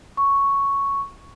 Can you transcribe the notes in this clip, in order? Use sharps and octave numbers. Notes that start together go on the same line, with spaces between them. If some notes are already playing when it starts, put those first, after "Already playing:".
C#6